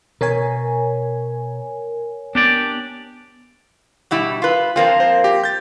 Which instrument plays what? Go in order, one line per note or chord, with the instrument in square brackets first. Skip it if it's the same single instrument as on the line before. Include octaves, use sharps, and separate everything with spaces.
[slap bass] B2 [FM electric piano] A#4 C#5 G#5
[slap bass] B3 [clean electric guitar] D4 G4 D5
[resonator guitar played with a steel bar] B2 G3 E4
F4 B4
[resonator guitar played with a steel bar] F3 A#3 C4 [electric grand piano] F4
[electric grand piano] C5
G4
G6 A6